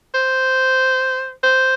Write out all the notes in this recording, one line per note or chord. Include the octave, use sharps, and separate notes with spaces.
C5
C5